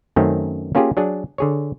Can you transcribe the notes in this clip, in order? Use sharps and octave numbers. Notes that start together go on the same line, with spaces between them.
F#2 D#3 A3 C4 C#4
A#3 C#4 F4 G4 G#4
F#3 D4 G#4
D3 G#4 C#5